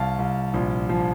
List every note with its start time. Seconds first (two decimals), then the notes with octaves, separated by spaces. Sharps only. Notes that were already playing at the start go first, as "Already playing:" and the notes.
Already playing: C2 F5 A5
0.18 C2
0.54 A#1
0.89 F3